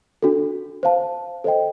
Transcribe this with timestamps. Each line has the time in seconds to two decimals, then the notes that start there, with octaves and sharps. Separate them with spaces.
0.23 D4 F#4 A4
0.83 C5 F5 A5
1.44 A4 C5 D#5 G5